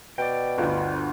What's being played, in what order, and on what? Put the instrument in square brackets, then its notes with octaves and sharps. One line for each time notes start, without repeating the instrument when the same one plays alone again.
[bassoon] B2 [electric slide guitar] D5 G5
[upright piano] G1 D2